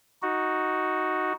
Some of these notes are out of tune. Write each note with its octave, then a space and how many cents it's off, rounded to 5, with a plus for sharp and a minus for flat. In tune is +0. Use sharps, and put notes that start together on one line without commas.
D#4 +5 F#4 +0